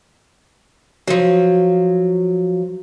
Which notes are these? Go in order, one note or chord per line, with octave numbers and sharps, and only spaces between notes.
F3 F#3